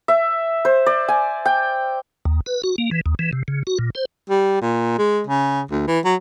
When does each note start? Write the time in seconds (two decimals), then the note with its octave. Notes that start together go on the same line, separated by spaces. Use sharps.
0.08 E5
0.65 C5
0.86 D5
1.08 G#5
1.45 G5
2.25 D#2
2.46 B4
2.64 F#4
2.78 A#3
2.91 E3
3.06 D#2
3.19 E3
3.33 C3
3.48 C#3
3.67 F#4
3.79 A#2
3.95 C5
4.30 G3
4.61 A#2
4.99 G#3
5.27 C#3
5.71 D2
5.87 E3
6.05 F#3